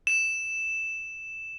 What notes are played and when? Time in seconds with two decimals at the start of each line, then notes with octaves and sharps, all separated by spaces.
0.07 E7